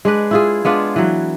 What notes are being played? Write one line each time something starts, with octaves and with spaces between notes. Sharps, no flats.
G#3 D4 B4
E4 F4 G#4
G#3 B3 D4 F4
E3 F#3